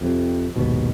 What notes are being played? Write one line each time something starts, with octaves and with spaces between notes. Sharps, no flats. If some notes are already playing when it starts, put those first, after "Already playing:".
F2 C3
A#1 D#2 G#2 B2